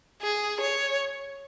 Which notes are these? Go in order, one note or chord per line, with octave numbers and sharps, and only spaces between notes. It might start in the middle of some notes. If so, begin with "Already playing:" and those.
G#4
C#5